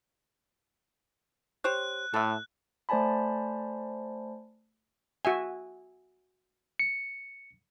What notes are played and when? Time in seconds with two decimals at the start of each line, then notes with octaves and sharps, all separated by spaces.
1.64 G4 C5 C#5 F#6
2.14 A2 A4 E5
2.89 A3 C5 D5 G#5 A5 B5
5.25 F#4 E5 G#5
6.80 C#7